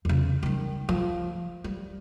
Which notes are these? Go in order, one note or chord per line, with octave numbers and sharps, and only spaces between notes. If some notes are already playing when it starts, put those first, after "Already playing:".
E2 C#3
D#3 G3
F3
G3